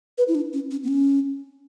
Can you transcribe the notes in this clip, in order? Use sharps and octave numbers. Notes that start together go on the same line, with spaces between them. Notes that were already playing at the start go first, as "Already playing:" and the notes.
B4
E4
D4
C#4
C#4
B3
C#4